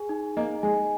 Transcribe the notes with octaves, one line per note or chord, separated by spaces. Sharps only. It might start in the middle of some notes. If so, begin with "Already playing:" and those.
Already playing: G#4 G#5
D#4
A#3 D#5
G#3 G#5